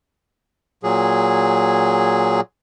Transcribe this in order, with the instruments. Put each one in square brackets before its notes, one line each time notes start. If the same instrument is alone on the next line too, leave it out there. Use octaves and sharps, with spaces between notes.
[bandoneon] A#2 F#3 G#4